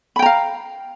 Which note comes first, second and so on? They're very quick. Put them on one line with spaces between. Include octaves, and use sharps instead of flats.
B5 G5 A#5 F5